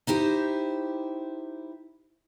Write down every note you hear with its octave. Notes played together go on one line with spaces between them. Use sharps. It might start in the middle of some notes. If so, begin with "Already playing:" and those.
D#4 E4 G4 C5